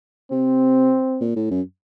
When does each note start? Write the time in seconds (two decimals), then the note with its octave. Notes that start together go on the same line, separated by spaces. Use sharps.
0.31 C3 C4
1.21 A#2
1.36 A2
1.51 F#2